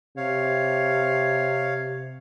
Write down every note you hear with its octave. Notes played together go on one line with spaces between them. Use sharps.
C3 C#5 F5